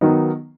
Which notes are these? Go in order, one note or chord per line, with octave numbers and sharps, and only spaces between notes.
D#3 F#3 B3 D#4